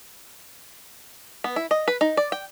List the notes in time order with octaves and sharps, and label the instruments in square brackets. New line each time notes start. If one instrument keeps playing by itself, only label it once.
[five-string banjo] B3
E4
D#5
B4
D#4
D5
G5